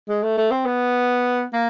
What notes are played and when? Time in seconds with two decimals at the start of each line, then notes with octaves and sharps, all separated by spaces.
0.09 G#3
0.23 A3
0.38 A3
0.51 C4
0.66 B3
1.53 A#3